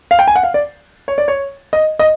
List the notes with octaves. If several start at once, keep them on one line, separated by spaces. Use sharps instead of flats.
F5
G5
G#5
F#5
F5
D5
C#5
D5
C#5
D#5
D#5